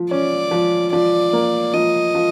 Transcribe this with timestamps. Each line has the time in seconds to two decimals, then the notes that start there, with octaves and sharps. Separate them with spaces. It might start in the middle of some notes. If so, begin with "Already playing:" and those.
Already playing: F3
0.11 C#4 D5
0.51 F3
0.93 F3 D5
1.33 A#3
1.74 F3 D#5
2.15 F3